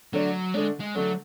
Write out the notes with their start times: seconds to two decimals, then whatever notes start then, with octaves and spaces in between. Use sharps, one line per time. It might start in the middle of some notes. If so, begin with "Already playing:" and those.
0.13 D3 F#3 A3 D4
0.54 D3 G#3 A3 D4
0.80 G#3
0.95 D3 F#3 A3 D4